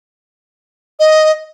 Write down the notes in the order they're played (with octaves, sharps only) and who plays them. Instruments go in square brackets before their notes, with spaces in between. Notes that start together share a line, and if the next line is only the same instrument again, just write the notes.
[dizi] D#5